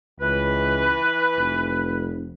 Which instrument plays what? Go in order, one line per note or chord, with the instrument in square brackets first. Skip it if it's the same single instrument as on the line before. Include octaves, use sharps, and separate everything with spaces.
[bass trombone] C#2 [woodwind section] E3 B4
[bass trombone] F1